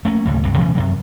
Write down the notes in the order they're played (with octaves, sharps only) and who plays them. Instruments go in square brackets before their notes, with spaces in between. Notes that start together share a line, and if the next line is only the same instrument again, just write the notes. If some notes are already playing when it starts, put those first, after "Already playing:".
[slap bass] A3 A#3 C#4
D2 A2 C#3
C#2 G2 C3
B2 E3 G3 C#4
F#2 C3 F#3